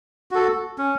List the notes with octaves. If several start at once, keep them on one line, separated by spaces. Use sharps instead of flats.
F#4 A4
C#4